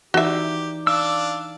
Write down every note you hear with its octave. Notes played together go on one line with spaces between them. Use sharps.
E3 D#4 F#4 G4 D5 E5
D4 F5 A5 E6